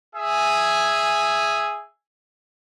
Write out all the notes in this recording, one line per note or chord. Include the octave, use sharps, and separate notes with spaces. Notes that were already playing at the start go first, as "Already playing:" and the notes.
G#4 E5 G#5